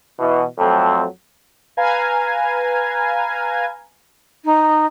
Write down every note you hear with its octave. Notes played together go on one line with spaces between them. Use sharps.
B2 E3
F2 F#3 A3 C4 A4
B4 F5 G#5 A#5 G#6
D#4